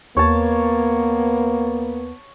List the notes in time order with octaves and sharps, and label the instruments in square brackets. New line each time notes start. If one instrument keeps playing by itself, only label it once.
[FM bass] D#2 [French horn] A#3 [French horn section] B3 [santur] C#5 A5